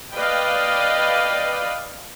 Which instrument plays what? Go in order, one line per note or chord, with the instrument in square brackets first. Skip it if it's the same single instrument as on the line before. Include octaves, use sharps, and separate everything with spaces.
[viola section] B4 D5 D#5 F5 G5